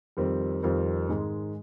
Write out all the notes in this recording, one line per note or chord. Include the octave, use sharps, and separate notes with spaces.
F2 D#3 G3 C4
F2 D#3 G3 C4
G#2 D#3 G#3